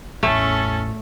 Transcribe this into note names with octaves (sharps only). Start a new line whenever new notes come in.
A1 E2 A3 C#4 A4